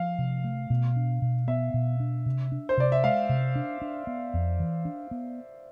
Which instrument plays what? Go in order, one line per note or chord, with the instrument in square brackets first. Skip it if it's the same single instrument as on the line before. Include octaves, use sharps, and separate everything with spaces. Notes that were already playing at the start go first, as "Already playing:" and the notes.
Already playing: [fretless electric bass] F3 [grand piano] F5
[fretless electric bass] C3
A3
B2
D4
B2
[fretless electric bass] B3 [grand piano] E5
[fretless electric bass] B2
D4
C3
D4
[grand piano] C5
[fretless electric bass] C3 [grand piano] D5
[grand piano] E5
[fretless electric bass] G#3 [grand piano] F5
[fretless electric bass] C3
D4
D4
B3
F2
E3
D4
B3